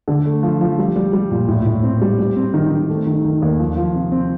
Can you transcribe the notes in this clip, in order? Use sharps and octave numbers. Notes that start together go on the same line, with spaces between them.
D3
A3
F3
F3
G3
G3
G3
A#2
A2
A2
C4
G3
G3
C4
D#3
D#3
A3
D#3
D#3
D#2
F3
F3
C3
C4